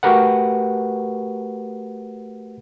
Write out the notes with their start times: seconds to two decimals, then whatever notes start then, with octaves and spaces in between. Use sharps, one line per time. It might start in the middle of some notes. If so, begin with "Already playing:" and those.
0.03 A3 F#4 G4 A#4 B4 F#5